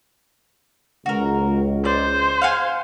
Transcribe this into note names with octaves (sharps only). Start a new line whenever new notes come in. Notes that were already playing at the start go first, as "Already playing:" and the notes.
C#2 F#4 A#4
C5 D5
F5 F#5 G#5